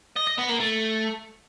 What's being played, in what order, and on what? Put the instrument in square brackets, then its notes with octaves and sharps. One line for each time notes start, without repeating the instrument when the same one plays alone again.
[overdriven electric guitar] D#5
D#5
B3
A#3
A3